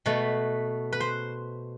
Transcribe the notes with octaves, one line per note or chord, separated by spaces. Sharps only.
B2 A3 B4
B4
C5